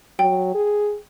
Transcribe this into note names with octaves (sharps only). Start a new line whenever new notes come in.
F#3 G5
G#4